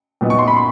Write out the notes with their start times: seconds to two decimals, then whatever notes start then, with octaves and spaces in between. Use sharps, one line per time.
0.21 A#2 F#3 B3 D#4
0.30 C#6
0.39 C6
0.48 B5
0.57 C6